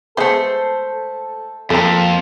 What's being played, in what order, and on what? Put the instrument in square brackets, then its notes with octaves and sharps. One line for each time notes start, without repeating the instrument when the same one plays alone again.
[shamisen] G#3 B3 [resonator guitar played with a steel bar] A3 C5 [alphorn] A4
[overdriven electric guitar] F2 [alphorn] A#3 [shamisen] A4 A#4